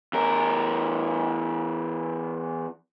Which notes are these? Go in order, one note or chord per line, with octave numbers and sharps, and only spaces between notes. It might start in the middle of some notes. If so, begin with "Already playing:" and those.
E2 A#4